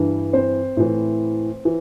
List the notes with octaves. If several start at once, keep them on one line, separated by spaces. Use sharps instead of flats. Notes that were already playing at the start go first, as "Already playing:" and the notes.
Already playing: G2 E3
C4 C5
A2 E3
E3